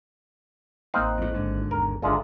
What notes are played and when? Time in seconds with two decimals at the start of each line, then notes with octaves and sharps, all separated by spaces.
0.94 A1 A#3 C4 D#4 F5 F#6
1.18 F2 A2
1.34 G#1 G#2 D3
1.71 E2 A#4
2.02 G#1 A#2 D3 G#3 F4 A4 E5